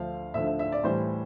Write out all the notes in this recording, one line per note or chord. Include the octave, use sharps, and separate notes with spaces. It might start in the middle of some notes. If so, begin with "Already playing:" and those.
Already playing: D2 D3 F3 F5
D2 D3 F3 E5
E5
E5
D5
A2 E3 G3 C5